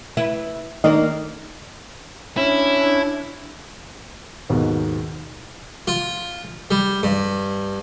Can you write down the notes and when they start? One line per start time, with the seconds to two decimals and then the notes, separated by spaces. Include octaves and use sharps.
0.17 E4 B4
0.84 D#3 A#3 D4 A#4 D#5
2.37 C#4 D4 E4
4.50 D#2 G#2 B2
5.87 F4
6.71 G3
7.03 G2